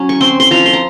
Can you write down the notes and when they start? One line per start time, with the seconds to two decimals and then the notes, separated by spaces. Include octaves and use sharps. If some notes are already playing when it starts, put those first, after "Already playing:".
Already playing: F#3 C#4
0.09 C#6
0.21 C4 C6
0.40 C6
0.51 F3 A#5
0.66 C6
0.73 A#5